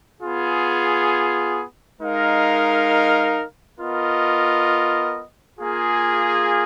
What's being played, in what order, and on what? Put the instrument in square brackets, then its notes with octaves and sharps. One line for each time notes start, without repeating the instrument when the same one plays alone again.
[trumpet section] B3 F4 G#4
G#3 D#4 A#4 F5
B3 F4 A#4 D#5
A#3 F4 G#4